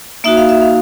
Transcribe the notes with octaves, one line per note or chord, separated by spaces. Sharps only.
A#3 D#4 F#4 E5
F5
E5
F5